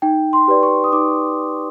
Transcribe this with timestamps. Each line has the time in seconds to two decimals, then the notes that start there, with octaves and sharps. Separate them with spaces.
0.02 D#4 G5
0.33 C6
0.48 G4 B4 D5
0.63 C#6
0.84 D#6
0.92 D#4 D6